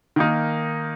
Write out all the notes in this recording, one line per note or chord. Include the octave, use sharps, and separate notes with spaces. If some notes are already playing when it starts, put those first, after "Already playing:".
D#3 A#3 D#4